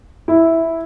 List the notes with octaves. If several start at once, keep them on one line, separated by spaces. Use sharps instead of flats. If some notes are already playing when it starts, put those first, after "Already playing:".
E4